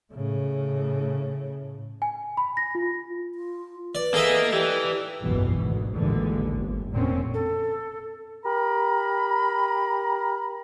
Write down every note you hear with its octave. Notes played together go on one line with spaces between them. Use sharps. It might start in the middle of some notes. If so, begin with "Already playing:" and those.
A2 C#3
G#5
B5
A#6
F4
F4
B4 D5
E3 A#3 B3 G#4 A4 D#5 E5
E3 G4 D5
F#1 B1 G#2 B2 E3
G#1 D2
A1 D#2 A#2 D3 E3 G#3
G1
F1 A#2 D3 C4 C#4
A4
G4 A#4 A#5 B5